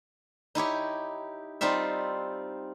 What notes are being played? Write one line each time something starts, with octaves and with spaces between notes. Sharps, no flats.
D#4 E4 G4 C#5
G3 C4 D#4 F4 E5